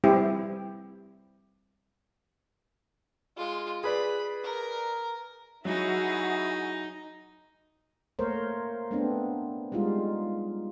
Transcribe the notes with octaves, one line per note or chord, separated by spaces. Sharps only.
G3 C4 E4 G4
G#3 F4
G#4 B4 D5 B5
A#4
F#3 D#4 E4 F#4 G#4
A3 A#3 A#4 C5 C#5
A3 B3 C4 D4
G3 G#3 D#4 F4